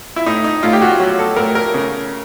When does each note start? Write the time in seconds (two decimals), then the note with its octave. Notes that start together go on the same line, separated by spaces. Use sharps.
0.16 E4
0.26 A2 D#4
0.44 D#4
0.63 A2 F4
0.73 G4
0.82 F#4
1.00 F#3
1.19 A4
1.36 A2 A#4
1.55 A#4
1.74 C#3